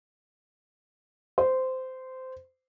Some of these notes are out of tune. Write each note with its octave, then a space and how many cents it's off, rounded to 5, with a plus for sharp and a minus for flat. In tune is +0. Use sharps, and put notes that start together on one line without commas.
C5 -15